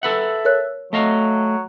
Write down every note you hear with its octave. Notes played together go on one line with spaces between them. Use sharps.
A4 B4 E5 F#5
A#4 C#5 F#6
F#3 A3 D#5 F5